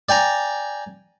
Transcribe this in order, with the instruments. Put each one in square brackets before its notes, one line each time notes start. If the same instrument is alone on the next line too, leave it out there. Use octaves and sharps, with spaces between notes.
[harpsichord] D5 G5 G#5 A#5